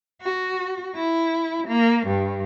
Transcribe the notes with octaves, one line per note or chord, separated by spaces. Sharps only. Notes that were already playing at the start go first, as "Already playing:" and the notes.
F#4
E4
A#3
G2